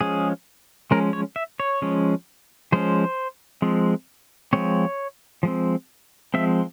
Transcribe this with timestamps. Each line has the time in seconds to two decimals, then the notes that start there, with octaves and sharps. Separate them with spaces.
0.01 F3 G#3 C#4 G#4
0.91 F3 G#3 C#4 A#4
1.13 C#5
1.36 E5
1.60 C#5
1.82 F3 G#3 C#4
2.72 F3 G#3 C#4 C5
3.62 F3 G#3 C4
4.53 F3 G#3 C4 C#5
5.43 F3 G#3 C4
6.34 F3 G#3 C4 E5